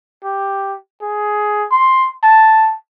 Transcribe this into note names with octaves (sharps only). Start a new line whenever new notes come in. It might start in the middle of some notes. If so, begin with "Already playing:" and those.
G4
G#4
C6
A5